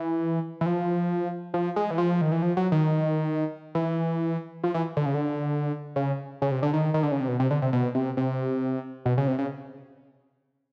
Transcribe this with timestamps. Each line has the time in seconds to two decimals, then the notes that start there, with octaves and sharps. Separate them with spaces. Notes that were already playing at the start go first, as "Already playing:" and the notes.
Already playing: E3
0.61 E3
0.66 F3
1.54 F3
1.76 G#3
1.91 E3
1.98 F3
2.21 D#3
2.32 E3
2.42 F3
2.57 F#3
2.72 D#3
3.75 E3
4.64 F3
4.74 E3
4.97 D3
5.06 C#3
5.14 D3
5.96 C#3
6.42 C#3
6.51 C3
6.62 D3
6.73 D#3
6.94 D#3
7.03 D3
7.12 C#3
7.20 C3
7.28 B2
7.40 C3
7.51 D3
7.62 C3
7.73 B2
7.95 C3
8.17 C3
9.05 B2
9.17 C#3
9.28 C3
9.39 C#3